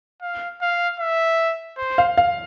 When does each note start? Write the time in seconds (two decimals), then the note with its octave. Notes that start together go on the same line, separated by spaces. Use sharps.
0.22 F5
0.62 F5
1.00 E5
1.78 C5
1.98 F5
2.17 F5